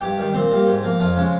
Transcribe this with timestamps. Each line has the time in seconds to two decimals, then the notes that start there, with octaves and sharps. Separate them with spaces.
0.01 G2 G4 G5
0.18 D#3 G3
0.34 A#2 C4 C5
0.51 G3 A#3
0.67 G#2
0.83 F3 A#3
1.00 F2 F3 F4
1.16 C#3 G#3